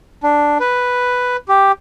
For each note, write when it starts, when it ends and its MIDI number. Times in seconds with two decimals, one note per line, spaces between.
0.23 0.58 62
0.60 1.37 71
1.48 1.72 67